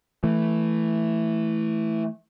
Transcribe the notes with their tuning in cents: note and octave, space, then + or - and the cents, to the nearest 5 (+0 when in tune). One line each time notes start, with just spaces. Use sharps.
E3 +0 A3 +0